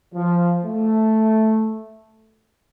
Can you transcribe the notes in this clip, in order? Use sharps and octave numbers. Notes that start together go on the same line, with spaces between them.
F3
A3